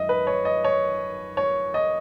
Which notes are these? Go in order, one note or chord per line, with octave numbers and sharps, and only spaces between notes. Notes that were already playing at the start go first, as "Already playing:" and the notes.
Already playing: F#2 D#3 G#3 D#5 E5
B4
C#5
D#5
C#5
C#5
D#5